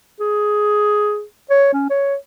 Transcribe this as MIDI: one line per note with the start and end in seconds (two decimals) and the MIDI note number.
0.20 1.23 68
1.50 1.69 73
1.73 1.87 61
1.90 2.15 73